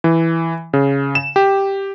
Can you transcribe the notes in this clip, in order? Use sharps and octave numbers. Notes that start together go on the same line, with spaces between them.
E3
C#3
E7
G4